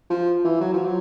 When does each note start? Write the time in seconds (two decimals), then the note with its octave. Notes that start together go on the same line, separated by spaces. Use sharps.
0.10 F3
0.44 E3
0.61 F#3
0.74 F3
0.85 F#3